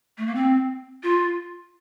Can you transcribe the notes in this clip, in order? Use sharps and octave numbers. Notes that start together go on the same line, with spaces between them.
A3
A#3
C4
F4